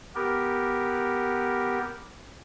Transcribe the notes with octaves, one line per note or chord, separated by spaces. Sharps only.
B3 G4 A#4